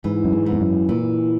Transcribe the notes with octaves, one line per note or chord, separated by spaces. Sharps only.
G#2 E3
F#2
G#2
E3
E2
F#2
A#2 E3